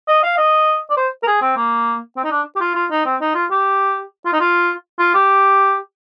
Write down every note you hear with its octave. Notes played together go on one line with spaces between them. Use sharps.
D#5
F5
D#5
D5
C5
A#4
G#4
C4
A#3
C4
D#4
D4
G4
F4
F4
D#4
C4
D#4
F4
G4
F4
D#4
F4
F4
G4